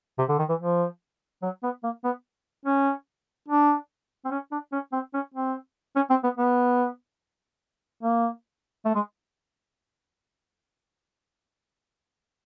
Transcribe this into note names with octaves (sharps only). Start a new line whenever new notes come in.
C3
D3
D#3
E3
F3
F#3
B3
A#3
B3
C#4
D4
C4
C#4
D4
C#4
C4
C#4
C4
C#4
C4
B3
B3
A#3
A3
G#3